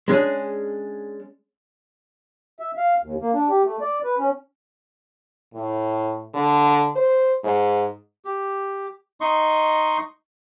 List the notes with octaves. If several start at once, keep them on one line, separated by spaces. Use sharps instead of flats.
G#3 C#4 D4 G#4
E5
F5
D#2
A#3
D4
G4
A3
D5
B4
C#4
A2
D3
C5
G#2
G4
D#4 D#5 C6 C#6